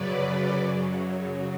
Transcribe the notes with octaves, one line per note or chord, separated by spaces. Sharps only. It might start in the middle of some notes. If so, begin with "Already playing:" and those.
Already playing: F#2 C#3 F#3 B4 D5
F#2 C#3 F#3